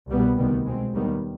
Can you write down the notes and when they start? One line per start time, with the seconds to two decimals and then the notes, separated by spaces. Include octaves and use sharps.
0.09 C2 B2 G3 B3
0.37 D2 C3 D#3 G3 B3
0.65 B2 G#3 C4
0.94 D#2 D#3 G3 B3